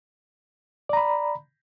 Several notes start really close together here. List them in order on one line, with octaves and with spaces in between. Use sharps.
D5 A#5 B5